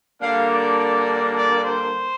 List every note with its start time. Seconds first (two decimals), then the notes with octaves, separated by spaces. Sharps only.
0.21 D3 G3 A#3 D4 F5
0.49 D5
0.78 D5
1.34 D5
1.63 C5